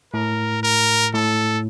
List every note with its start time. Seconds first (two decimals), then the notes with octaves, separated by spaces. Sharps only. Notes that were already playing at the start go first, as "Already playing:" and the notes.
0.14 A2 A#4
0.63 A#4
1.13 A2 A4